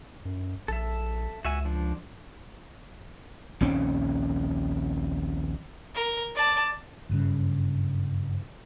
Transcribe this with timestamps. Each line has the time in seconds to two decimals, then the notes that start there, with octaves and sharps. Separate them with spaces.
0.25 F#2
0.68 A#1 A4 E5
1.45 C#2 F#4 E5 G#5
1.65 F3 D4
3.61 A#1 D#2 C4 C#4
5.95 A#4
6.35 D5 A5
7.09 F#1 G2 C#3